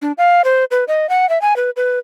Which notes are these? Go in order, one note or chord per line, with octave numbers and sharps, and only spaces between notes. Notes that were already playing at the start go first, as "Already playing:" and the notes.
D4
F5
C5
B4
D#5
F#5
E5
G#5
B4
B4